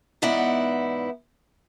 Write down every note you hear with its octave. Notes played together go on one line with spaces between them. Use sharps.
E2 G#2 B3 D#4 E4 D5